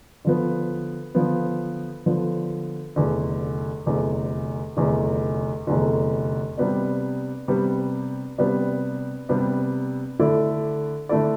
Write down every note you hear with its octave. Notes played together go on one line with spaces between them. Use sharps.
D3 F3 B3
D3 F3 B3
D3 F3 B3
F1 E2 D3
F1 E2 D3
F1 E2 D3
F1 E2 D3
C3 G3 B3 D4
C3 G3 B3 D4
C3 G3 B3 D4
C3 G3 B3 D4
D3 A3 E4 A4 D5
D3 A3 E4 A4 D5